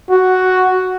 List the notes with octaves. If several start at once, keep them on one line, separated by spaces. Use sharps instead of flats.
F#4